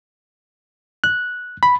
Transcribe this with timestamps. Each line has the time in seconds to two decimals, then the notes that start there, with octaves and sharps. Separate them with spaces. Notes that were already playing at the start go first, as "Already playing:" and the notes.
1.04 F#6
1.63 B5